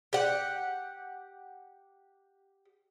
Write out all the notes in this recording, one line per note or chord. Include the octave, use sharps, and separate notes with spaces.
G4 F#5